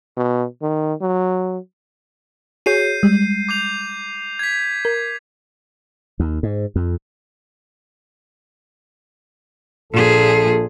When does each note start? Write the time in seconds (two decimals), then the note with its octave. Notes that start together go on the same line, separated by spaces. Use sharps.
0.17 B2
0.62 D#3
1.01 F#3
2.66 F#4 G#4 C#5 G6 C7 D#7
3.03 G3 G#3
3.49 D6 G6 F7
4.39 G#6 B6
4.85 A#4 G#6
6.20 D#2
6.43 G#2
6.76 F2
9.93 A#1 A#2 G#4 A4